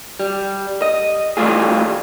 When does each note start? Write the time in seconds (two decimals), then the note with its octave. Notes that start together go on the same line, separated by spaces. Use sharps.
0.20 G3
0.82 D#5
1.37 E3 G3 A3 C4 F4 G#4